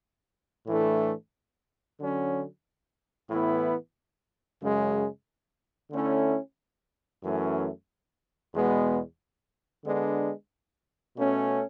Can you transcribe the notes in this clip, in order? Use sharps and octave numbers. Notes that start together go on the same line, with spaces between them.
A2 E3 A3 D4
D3 F#3 C#4
A2 E3 B3 E4
F#2 C#3 G#3
D3 A3 C#4 E4
F#2 E3 A3 C#4
E2 B2 G#3 B3
D3 G#3 B3 D4
B2 A3 C#4